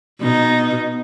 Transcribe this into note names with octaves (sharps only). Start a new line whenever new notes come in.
B2 D#4